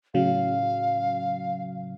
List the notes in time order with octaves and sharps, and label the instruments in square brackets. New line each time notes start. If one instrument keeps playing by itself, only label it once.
[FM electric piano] A2 C#3 F#3 [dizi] F5